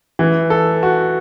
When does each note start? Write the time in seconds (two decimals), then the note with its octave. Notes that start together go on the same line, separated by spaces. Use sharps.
0.19 E3
0.50 A4
0.83 F#4